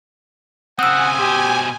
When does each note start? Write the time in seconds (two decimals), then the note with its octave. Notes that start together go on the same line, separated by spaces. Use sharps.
0.79 C#3 C4 F#5 G#5 D#6 E6
1.19 B2 G4 C5